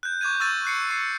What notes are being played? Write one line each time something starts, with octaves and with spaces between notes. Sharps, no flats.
F#6 G6
C#6 D6 G6 G#6 D#7
C#6 E6 F#6 A6 D#7
F#6 C7 C#7
C#6 C7